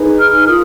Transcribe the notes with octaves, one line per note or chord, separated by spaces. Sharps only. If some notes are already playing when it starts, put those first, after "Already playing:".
Already playing: D#4 G#4 B4
F6
F6
F4 A#4 D#6